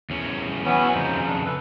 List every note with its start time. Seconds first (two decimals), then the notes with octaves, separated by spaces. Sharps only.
0.10 E2 C#4
0.65 E3 F#3 B3 C#4 B4
0.94 F2 C#3 D#4 C5
1.26 D4
1.45 A4 B4